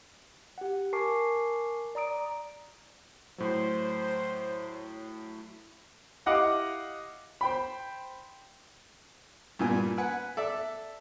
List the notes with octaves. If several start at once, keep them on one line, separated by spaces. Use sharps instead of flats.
G4 F#5
A#4 G#5 A5 C#6 D6 C7
D5 A#5 D#6 D7
A2 F#3 C5
E4 G4 D#5 F5 F#5 D6
C5 G5 B5
G2 A#2 G#5
B4 F#5 G#5
A4 D5 E5